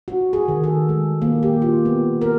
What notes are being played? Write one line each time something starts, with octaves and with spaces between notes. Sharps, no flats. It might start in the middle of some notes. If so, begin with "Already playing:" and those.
F#4
G#4
D#3
A4
G#3
A#3
G4
F4
B3
A#4